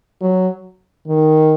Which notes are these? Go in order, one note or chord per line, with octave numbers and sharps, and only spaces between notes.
F#3
D#3